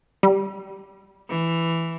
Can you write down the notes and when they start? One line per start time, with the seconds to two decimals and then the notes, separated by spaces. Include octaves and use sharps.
0.23 G3
1.29 E3